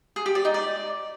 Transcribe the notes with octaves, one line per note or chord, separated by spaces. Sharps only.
G#4
G4
D5
D#4
D5